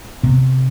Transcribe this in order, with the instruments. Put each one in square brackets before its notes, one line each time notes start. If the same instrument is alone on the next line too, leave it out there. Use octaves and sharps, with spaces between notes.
[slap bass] C3 B3